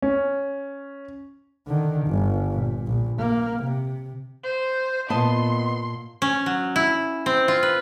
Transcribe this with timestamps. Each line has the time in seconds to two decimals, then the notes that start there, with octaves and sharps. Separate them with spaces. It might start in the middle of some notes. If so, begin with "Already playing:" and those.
0.02 C#4
1.68 D3 D#3
2.06 G1
2.53 A#2
2.87 A#1
3.19 A#3
3.63 C3
4.44 C5
5.10 A#2 B3 D#5 A5 C6
6.22 C#4
6.46 F#3
6.76 E4
7.26 C4
7.48 F4
7.63 B4